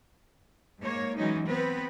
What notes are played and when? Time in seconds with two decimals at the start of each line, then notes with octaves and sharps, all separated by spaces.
0.82 G#2 A#3 C#5
1.17 E3 F#3 G#3 C#4 D#4
1.47 B3 C4 B4